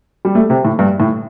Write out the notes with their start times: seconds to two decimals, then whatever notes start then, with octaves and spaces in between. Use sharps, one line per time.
0.25 G3
0.35 A3
0.50 C3
0.65 A2
0.79 G2
1.00 A2